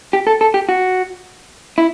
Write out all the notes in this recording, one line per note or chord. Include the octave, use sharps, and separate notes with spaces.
G4
A4
A4
G4
F#4
E4